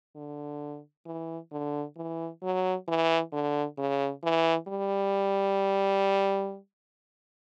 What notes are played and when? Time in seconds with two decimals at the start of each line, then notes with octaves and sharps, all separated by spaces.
0.16 D3
1.06 E3
1.52 D3
1.97 E3
2.43 F#3
2.88 E3
3.33 D3
3.78 C#3
4.23 E3
4.68 G3